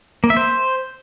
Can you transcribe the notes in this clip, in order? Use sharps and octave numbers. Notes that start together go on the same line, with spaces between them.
A#3
E5
C5